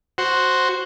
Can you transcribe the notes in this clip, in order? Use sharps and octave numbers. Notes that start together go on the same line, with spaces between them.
F#4 C5